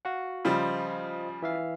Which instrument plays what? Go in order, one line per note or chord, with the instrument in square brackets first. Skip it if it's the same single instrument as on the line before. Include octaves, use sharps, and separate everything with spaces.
[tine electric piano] F#4 F5 F#5
[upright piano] C#3 F3 G3 [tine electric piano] F4 C5 D#5
[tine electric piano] E3 E5 F5